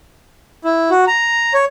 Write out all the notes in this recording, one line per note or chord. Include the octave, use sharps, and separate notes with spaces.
E4
F#4
A#5
C#5